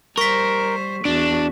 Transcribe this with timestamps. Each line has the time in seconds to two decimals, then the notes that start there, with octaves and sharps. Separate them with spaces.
0.18 G3 A#4 C5 C#6 B6
1.05 E2 D4 F#4